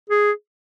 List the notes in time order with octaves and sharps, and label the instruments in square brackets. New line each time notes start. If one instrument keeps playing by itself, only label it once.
[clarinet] G#4